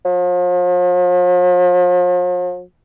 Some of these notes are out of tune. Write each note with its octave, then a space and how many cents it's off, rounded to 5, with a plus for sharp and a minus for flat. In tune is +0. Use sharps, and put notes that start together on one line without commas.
F3 +45